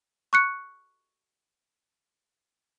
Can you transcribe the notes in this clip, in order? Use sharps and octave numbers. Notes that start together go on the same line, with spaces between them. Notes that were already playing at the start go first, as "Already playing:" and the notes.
C#6 F#6 C#7